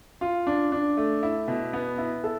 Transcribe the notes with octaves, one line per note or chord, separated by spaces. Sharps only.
F4
D4
D4
A3
E4
B2
B3
E4
A4